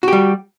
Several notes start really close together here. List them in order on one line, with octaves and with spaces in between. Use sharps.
F#4 G4 G3